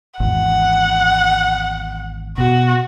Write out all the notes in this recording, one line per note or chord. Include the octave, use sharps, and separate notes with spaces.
G#1 E2 F#5
B2 F#4